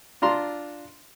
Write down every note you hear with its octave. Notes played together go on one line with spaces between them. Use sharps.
D4 F4 A#5 C6